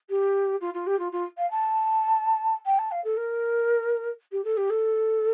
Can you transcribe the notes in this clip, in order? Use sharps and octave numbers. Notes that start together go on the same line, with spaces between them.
G4
F4
F4
G4
F4
F4
F5
A5
G5
A5
F5
A4
A#4
G4
A4
G4
A4